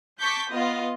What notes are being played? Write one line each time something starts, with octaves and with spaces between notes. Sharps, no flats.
A5 C#6 D6 G6 B6
B3 F4 D#5